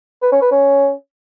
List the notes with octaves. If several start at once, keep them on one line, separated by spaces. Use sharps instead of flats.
B4
C#4
B4
C#4